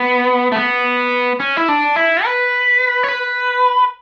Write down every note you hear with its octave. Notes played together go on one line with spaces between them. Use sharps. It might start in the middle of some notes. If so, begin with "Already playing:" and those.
Already playing: B3
A3
B3
C#4
E4
D4
E4
B4
C#5
B4